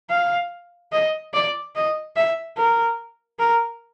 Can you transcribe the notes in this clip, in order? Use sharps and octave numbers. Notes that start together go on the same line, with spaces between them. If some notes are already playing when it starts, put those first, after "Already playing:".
F5
D#5
D5
D#5
E5
A#4
A#4